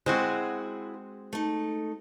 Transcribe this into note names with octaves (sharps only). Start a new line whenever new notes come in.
G#3 C4 E4 F#4 G#4 C5
A3 D#4